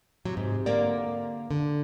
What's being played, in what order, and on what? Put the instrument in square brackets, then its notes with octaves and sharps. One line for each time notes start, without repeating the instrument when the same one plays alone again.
[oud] C3 [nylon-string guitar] F#3
[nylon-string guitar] G#2
[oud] D3 A#3 A#4 [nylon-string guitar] D5
[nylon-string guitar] D3